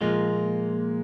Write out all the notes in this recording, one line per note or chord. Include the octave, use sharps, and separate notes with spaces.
A#2 F3 G#3 A#3 F4